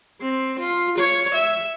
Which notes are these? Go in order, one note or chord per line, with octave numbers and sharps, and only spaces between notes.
C4
F4
C#5
E5